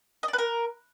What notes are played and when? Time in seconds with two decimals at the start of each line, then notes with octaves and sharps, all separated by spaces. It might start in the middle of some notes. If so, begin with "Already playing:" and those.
0.23 D#5
0.28 D5
0.33 B4
0.38 A#4